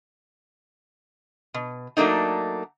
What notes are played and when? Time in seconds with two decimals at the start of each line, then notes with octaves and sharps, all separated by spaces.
1.54 B2
1.97 F#3 A3 A#3 D4 D#4